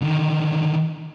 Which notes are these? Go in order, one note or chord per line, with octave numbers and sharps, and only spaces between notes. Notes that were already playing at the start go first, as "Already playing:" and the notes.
D3 D#3